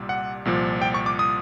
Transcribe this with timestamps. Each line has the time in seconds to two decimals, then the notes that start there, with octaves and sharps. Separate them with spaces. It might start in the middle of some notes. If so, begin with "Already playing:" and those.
Already playing: C2 A#2 G3
0.09 F#5
0.45 C2 A#2 F3
0.82 G5
0.94 C#6
1.06 D6
1.19 D#6